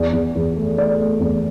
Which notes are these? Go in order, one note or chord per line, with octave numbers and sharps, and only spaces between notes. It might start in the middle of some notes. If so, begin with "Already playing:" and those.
Already playing: E2 D5
E2
E2
A3
A3 D5
A3
E2